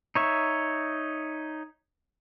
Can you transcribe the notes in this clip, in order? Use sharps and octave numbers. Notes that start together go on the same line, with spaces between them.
D#4 C#5 E5